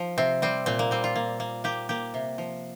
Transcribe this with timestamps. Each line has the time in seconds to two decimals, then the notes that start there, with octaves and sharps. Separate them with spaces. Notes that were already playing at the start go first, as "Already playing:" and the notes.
Already playing: F3
0.18 C3 C4
0.42 G3 C4
0.66 A#2 C4
0.79 A#3
0.91 G3 C4
1.04 F4
1.16 A#3
1.40 A#3
1.64 A#3 G4
1.89 A#3 G4
2.14 C3
2.38 F3